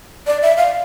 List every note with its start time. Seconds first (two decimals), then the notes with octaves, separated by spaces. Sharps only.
0.27 D5
0.42 E5
0.57 F5